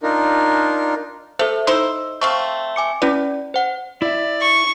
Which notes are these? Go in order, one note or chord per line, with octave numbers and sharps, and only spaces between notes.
D4 D#4 F4 A#4
A3 A4 C5
D#4 E4 C5 C6 E6
A3 C4 F5 C#6
G#5 D6 C#7
C#4 E4 B4 D5
C5 F#5
E4 D5 E5
C#6